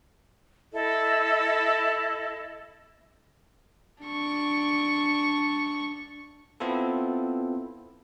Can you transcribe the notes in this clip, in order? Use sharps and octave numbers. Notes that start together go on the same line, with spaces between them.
E4 A4 D#5
D4 C#6
B3 C4 E4 F4 A4